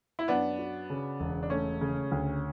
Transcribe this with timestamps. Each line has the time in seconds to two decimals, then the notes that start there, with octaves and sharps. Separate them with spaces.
0.19 E4
0.28 F#2 B3 D4
0.58 F#4
0.90 C#3
1.20 E1
1.43 D4
1.50 A3 C#4
1.81 C#3
2.11 D2